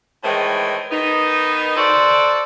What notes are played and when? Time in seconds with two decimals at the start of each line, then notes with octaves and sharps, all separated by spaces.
0.24 A2 D#3 E3 G#3 C5
0.91 D#3 B3 D#4
1.77 F#4 A4 C5 D5